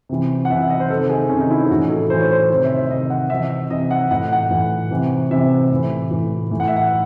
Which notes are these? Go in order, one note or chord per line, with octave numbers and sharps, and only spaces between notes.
C3 E3
F#5
C3 E3 E5
E5
D#5
C5
C3 D#3 A4
G#4
C3 D#3 C#4
D#4
E4
G#4
A2 E3 F#4
A4
A2 E3 C5
C#5
C5
C3 D#3 C5
E5
E5
C3 D#3 D#5
F#5
C3 E3 E5
C3 E3 D#5
F#5
A2 E3 F#5
F#5
A2 E3
C3 E3
C3 E3 E5
A2 E3
A2 E3
A2 E3
F#5
E5
F#5